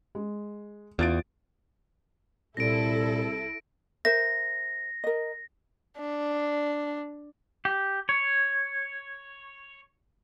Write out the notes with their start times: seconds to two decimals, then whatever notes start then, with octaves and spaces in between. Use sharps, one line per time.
0.15 G#3
0.99 E2 F4 A6 D7
2.57 C2 A#2 E4 A4 A#6 D7
4.05 A#4 C5 E5 A#6
5.04 A#4 D#5
5.99 D4
7.65 G4
8.09 C#5